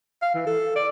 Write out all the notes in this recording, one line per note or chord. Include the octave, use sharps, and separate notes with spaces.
F5
E3
A4
D5